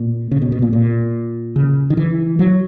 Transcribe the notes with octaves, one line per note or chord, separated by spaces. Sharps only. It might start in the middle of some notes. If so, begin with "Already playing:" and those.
Already playing: A#2
C#3
B2
B2
A#2
A#2
C#3
D#3
E3
F#3